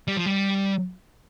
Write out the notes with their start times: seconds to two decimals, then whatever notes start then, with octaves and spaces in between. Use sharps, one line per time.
0.08 G3
0.17 F3
0.26 G3